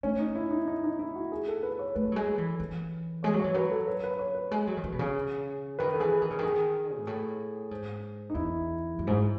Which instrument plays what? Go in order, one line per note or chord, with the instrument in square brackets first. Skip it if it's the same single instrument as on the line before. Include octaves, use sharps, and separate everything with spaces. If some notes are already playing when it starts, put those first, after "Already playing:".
[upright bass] A3 [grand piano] C#4
[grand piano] D#4
E4
D#4
D#4
D#4
E4
F#4
G#4
A4
B4
C#5
[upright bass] A3 [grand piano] B4
[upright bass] F#3
G#3
E3
E3
[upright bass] G#3 [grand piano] C#5
[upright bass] F#3
[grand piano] C#5
[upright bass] E3
[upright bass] F#3 [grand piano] B4
[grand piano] A4
B4
B4
C#5
B4
[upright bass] G#3
F#3
D#3
E3
B2
C#3
[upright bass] D#3 [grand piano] B4
[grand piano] A4
[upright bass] E3 [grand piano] G#4
[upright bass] D#3 [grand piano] G#4
[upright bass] C#3
[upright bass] D#3 [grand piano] G#4
[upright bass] G#2
A2
G#2
[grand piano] D#4
[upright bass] E2 [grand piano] E4
[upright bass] F#2
G#2